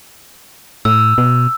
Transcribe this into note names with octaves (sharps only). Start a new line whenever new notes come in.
A2 E6
B2